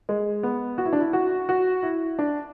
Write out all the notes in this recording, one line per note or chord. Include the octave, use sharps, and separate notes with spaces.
G#3
B3
F#4
E4
D4
E4
F#4
F#4
E4
D4